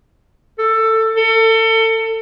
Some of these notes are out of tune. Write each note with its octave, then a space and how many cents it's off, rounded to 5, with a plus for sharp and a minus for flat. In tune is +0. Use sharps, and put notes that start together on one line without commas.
A4 +15
A4 +30